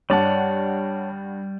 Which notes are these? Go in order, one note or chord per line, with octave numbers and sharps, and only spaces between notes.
G2 G3 C#5 D5 F#5 A5